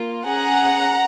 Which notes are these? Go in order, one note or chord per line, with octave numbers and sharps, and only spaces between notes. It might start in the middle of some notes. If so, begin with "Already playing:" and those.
Already playing: A#3 F4
C#4 G#4 F#5 A#5